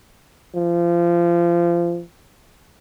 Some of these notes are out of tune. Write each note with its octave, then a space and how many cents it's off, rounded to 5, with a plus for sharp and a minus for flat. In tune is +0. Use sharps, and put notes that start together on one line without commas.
F3 -25